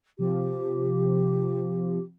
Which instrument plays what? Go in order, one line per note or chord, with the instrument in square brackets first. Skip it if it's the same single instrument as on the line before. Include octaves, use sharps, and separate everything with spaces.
[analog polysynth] C3 F3 [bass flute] G4